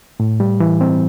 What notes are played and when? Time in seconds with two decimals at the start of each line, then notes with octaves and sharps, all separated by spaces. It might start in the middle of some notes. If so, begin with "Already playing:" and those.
0.20 A2
0.40 G3
0.60 E3
0.81 C4